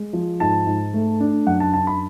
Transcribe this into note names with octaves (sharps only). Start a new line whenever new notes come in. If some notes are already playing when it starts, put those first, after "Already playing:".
Already playing: G#3
F3
G#2 A5
G#2
A3
D4
F#2 F#5
A5
D4 A5
B5